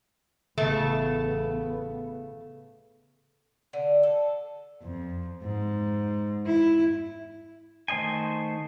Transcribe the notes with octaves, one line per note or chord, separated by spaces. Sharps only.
A1 C#3 A3 B3
D3
A4
F2
G#2
E4
D#3 A3 C5 D#5 G#5